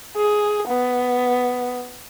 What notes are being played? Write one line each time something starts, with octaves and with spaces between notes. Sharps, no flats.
G#4
B3